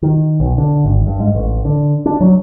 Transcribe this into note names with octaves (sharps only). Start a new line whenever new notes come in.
D#3
B1
D3
G#1
G2
G#2
A1
D3
D4
F#3